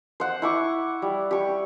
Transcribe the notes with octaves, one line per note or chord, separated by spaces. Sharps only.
C5 F#5
E4 C#6 D6
G3
G4 C#6